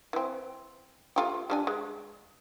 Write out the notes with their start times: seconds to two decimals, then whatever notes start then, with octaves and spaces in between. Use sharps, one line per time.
0.13 E3 C4
1.16 A3 F4 G4
1.50 G3 D4 G#5
1.67 G#3